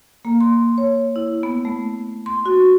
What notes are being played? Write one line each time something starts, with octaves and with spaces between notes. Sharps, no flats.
A#3
C6
C#5
E4
B3
A3
C6
F#4